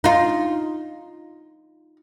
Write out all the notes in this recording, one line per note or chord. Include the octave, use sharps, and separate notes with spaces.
D#4 F4